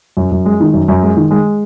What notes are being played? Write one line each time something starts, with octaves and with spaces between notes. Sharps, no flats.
F#2
F#2
G#3
D#3
F#2
F#2
G#3
D#3
G#3